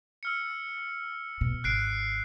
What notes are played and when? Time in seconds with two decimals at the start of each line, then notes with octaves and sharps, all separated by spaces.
0.23 E6 F6 C#7
1.41 B2
1.64 G#1 F#6 C7 D7